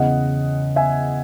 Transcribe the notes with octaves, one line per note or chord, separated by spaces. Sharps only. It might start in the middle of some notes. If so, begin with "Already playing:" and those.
Already playing: E2 C#3 E3 D#5 F#5
E5 G#5